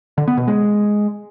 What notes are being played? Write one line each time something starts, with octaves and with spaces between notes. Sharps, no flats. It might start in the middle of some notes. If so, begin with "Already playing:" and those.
D3
B3
B2
G#3